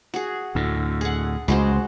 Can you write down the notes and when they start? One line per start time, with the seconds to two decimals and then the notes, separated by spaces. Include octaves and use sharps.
0.14 F#4 G#4
0.55 D2 A2
1.01 G#4 F#5
1.48 C#2 G#3 F#4 C5